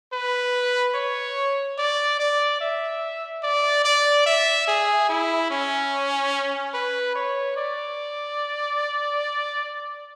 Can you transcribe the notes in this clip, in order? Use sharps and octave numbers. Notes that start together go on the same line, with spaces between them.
B4
C#5
D5
D5
E5
D5
D5
E5
G#4
E4
C#4
B4
C#5
D5